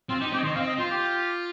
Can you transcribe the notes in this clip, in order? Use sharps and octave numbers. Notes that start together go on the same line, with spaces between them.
C4 F4
D#4 G4
C4 G4
D#5
D#3 C5
D#5
C4 F5
D#5
F4 C5
G4